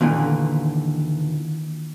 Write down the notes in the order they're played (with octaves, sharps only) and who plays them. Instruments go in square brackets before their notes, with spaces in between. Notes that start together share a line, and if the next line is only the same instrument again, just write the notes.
[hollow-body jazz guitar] D#2 A#2 D3 E3